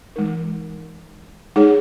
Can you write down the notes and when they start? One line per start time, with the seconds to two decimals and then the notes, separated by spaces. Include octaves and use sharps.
0.16 E3 G#3 D#4 A#4
1.56 G#3 D#4 G#4 C#5